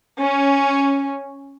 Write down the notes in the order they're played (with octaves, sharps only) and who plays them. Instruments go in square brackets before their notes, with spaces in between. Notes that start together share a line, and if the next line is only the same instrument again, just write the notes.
[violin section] C#4